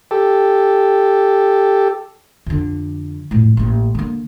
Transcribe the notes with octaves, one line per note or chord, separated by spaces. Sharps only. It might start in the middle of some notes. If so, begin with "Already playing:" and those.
G4 A4
F2 D3
F2 A2
A1 A#3
D3 A#3